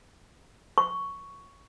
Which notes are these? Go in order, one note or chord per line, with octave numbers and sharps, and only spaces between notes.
C#6